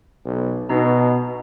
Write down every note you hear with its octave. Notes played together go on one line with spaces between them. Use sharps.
B1
B2 D#4 A#5